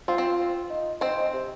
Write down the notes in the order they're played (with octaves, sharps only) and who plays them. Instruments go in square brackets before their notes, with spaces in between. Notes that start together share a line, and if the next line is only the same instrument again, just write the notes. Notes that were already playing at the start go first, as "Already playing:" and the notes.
[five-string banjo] C4 [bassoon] F4
[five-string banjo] C4 C5
[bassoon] D#4
[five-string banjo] C4 C5 [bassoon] D#4
[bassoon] D#4
C3